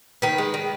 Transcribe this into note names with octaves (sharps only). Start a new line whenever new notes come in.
D#3 B4
G#3
D#3